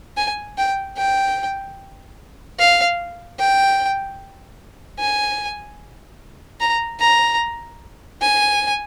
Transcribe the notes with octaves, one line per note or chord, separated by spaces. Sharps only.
G#5
G5
G5
F5
G5
G#5
A#5
A#5
G#5